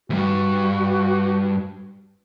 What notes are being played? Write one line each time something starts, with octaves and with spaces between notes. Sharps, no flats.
D2 G2 F#4